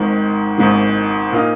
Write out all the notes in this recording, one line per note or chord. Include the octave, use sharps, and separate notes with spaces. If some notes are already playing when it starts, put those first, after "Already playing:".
Already playing: G#1 G#2 D#3
G#1 G#2 D#3
A#2 A#3 D#4